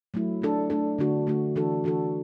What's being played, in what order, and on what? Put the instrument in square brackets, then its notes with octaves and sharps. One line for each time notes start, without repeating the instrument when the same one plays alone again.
[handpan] F#3 A3 E4
A3 D4 A4
A3 D4 A4
D3 A3 D4 F#4
D3 A3 D4 F#4
E3 D4 F#4 A4
E3 D4 F#4 A4